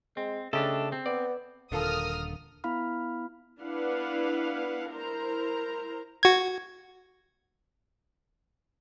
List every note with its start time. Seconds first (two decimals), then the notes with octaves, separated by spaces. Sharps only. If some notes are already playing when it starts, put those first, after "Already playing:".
0.17 G#3 C4
0.53 C#3 A3 D4 G4 A4 D#5
0.92 C4
1.06 B3 D5
1.72 D#1 D3 A3 F4 A4 A#4 D#6 F6
2.64 B3 E4 F5 B5 F6
3.62 B3 D4 E4 B4 F5 F#5
4.90 E4 A#4 C5 A#5
6.23 F#4 G#6